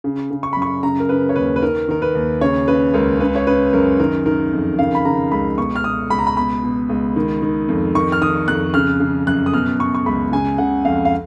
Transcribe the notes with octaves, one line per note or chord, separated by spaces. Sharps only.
C#3
C#3
C#6
F#2 B5
C#6
C#3 A#5
A#4
C#3 B4
C#5
D#2 B4
B4
D#3 A#4
D#3 A#4
B4
D#2
C#3 C#5
C#3 B4
C#2 A#4
C#3 B4
C#5
C#3 B4
F#2 A#4
D#3 A#4
D#3 A#4
F2
C#3 F5
B5
C#3 A#5
C#2 B5
B2 C#6
F6
B2 D#6
C#2 B5
A#5
B5
B2 B5
B2
C#2
D#3
D#3
F2
D#3 C#6
F6
D#3 D#6
F2 F#6
C#3 F6
C#3
F#2 F#6
D#6
B2 F6
B2 C#6
C#6
C#2 B5
C#3 G#5
C#3 F#5
F2 F5
F5